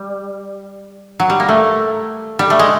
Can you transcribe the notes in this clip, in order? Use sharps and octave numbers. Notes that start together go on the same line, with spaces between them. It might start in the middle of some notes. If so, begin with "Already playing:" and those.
Already playing: G3
F#3
G3
A#3
A3
G3
A3
G#3